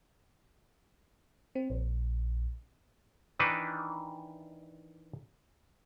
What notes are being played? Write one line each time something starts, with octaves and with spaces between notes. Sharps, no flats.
C4
A#1
D#3 E3 D4 D#4 B4